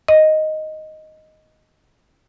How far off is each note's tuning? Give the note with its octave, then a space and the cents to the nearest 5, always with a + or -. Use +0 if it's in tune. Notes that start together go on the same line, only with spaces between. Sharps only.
D#5 +0